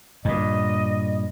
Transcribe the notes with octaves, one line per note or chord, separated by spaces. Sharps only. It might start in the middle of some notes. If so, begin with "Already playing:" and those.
G2 A#2 D#5